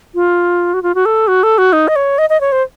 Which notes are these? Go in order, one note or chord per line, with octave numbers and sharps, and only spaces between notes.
F4
F#4
F4
F#4
A4
F#4
A4
F#4
D#4
D#5
C#5
D#5
D#5
C#5
C5